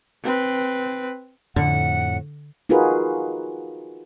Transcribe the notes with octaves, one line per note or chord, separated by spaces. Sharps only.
C4 B4
F2 A2 D3 F#5
D#4 F4 F#4 G#4 A#4 B4